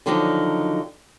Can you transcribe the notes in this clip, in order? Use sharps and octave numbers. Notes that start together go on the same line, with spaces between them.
D3 D#3 F3 F#3 D4 D#4